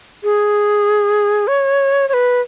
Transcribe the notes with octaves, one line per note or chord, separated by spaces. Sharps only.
G#4
C#5
C#5
B4